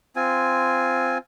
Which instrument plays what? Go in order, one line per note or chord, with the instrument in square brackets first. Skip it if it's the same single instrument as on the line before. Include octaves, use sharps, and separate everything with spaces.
[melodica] C4 F4 G#5